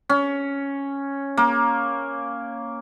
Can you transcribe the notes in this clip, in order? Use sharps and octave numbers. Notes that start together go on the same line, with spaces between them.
C#4
A#3